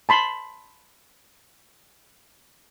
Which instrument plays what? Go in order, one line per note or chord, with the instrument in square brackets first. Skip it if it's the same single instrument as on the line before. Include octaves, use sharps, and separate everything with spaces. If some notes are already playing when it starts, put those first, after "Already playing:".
[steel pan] A5 B5 C6